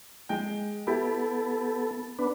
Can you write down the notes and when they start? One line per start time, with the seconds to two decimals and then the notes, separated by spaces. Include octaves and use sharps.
0.29 G#3 G5
0.87 B3 E4 G4 A4
2.19 B3 D4 B4